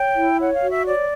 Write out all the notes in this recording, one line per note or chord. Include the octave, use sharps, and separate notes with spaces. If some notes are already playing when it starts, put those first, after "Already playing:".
Already playing: C#5 G5
E4
C#5 F#5
F5
F#4
E5
C#5 D5